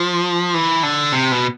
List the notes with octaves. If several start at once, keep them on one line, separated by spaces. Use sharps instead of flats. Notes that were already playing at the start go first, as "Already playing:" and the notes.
Already playing: F3
E3
D3
C3
B2